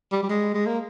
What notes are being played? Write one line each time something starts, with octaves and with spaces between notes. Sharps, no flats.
G3
G3
G#3
G#3
A#3